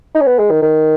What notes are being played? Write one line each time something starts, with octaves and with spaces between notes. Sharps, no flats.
D#4
C#4
B3
G#3
D#3
D#3